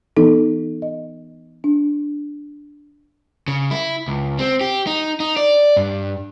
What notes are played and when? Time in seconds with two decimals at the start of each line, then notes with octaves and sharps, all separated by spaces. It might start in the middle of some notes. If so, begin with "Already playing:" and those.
0.17 E3 B3 D#4 A4
0.82 D#5
1.64 D4
3.48 C#3
3.71 E4
4.08 C#2
4.39 C4
4.61 G4
4.87 D#4
5.20 D#4
5.37 D5
5.77 G2